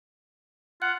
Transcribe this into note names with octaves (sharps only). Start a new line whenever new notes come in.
F4 F#5 F#6